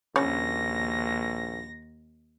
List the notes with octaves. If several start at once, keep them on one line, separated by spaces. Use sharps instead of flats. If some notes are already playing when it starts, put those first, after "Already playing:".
A#1 D#2 C#3 C#5 A#6